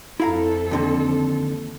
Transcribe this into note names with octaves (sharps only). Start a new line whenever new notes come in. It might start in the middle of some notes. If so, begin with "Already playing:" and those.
F2 E4 A4 F5 A#5
D#2 D3 C4